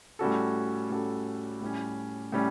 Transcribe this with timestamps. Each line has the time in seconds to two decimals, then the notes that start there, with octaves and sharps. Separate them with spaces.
0.19 A2 G3 C#4 F#4 A4
0.90 A2 G3 C#4 F#4 A4
1.61 A2 G3 C#4
2.32 A2 G3 C#4